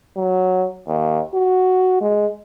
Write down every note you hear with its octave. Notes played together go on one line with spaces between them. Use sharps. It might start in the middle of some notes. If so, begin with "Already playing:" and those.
F#3
D#2
F#4
G#3